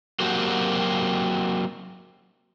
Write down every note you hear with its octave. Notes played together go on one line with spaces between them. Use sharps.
F#3 A#3 C4 F#4 G4